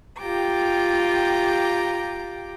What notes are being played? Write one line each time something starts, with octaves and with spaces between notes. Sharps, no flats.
F4 G4 G5 A#5 D6